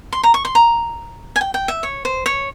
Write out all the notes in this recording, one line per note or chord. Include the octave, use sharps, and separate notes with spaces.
C6
A#5
C#6
C6
A#5
G#5
G5
G5
E5
C#5
C5
C#5